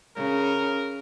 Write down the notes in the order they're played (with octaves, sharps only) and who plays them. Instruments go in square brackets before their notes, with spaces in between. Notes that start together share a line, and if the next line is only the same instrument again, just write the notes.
[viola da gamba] C#3 [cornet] A#4